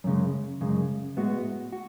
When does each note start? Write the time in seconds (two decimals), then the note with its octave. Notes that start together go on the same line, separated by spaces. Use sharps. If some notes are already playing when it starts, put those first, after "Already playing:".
0.04 F#2 C#3 G#3
0.61 F#2 C#3 G#3
1.17 A2 G#3 B3 F#4
1.73 F#4